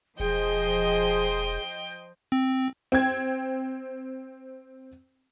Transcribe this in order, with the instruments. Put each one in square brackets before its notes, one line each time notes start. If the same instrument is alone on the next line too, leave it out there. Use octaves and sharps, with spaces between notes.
[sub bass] E1 [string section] F3 C5 D#5 [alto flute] G#4 [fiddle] G5
[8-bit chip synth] C4
[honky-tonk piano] C4 G5 G#6